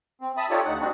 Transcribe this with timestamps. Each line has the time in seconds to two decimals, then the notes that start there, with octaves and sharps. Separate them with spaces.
0.21 C4
0.37 E5 A5 B5 D#6
0.50 D#4 F4 G4 A4 C#5 D5
0.65 D2 D#4 F#5
0.80 G3 C4 D4 D#4 F#4